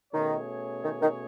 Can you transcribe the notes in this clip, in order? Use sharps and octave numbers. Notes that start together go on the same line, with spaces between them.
B2 D#3 A3 C#4 G#4 C#5
D#3
D#3